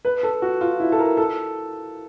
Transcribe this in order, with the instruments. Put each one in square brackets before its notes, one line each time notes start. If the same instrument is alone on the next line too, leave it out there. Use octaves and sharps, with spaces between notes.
[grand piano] B4
A4
F#4
F4
E4
A4
A#4
A4